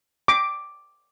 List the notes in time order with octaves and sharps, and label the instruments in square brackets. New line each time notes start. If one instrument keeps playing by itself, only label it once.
[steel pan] D6